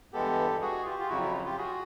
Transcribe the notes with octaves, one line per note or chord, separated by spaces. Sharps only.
G2 E3 G#3 B3 G4 A4
F#4 G#4
F4 G4
F4
F2 C#3 F#3 E4 F#4
E4
F4
F4 G4
F#4 G#4